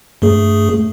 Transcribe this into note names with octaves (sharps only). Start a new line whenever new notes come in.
G2 A3 G#4